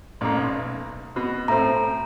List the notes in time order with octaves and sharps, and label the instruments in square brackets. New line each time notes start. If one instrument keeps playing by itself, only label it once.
[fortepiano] A1 A#3
B1
B2
[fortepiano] A2 C4 [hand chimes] A#5